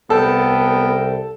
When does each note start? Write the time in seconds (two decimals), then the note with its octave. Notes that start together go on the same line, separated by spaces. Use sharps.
0.10 C2 B3 A4 A#4 G5